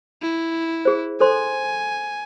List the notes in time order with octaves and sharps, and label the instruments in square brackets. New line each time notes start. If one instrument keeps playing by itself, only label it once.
[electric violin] E4
[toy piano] G#4 C5
[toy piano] A4 C5 C6 [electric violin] G#5